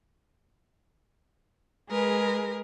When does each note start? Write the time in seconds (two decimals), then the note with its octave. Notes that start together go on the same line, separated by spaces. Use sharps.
1.89 G#3 G#4 A#4 B4